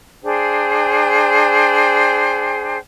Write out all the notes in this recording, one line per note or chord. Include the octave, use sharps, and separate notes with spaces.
D4 G#4 C5 G5